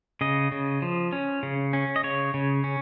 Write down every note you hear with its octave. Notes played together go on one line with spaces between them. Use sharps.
C#3 D#5
C#3
F3
C#4
C#3
C#4
D#5
C#3 C#5
C#3
C#4